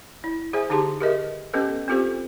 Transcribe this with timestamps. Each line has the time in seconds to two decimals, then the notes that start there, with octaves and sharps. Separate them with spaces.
0.24 E4
0.53 G#4 C5 E5 G#5
0.70 D3 D#4 G4 G#4 A5 C6
1.00 G4 G#4 A#4 B4 D#5 E5
1.53 B3 C#4 G4 A4 B4 D#5
1.88 C4 F4 G4 A4 C5